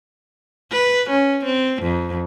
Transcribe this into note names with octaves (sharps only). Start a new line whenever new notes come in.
B4
C#4
C4
F2